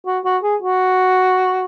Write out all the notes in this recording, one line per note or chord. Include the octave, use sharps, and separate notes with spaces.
F#4
F#4
G#4
F#4